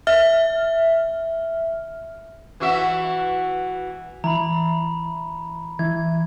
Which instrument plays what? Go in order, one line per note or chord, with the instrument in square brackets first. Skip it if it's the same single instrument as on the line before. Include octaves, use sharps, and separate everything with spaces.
[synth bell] E5 F6
[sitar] E3 F#4 E5
[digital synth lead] E3 [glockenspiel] A#5 B5
[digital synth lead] E3 [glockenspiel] G#6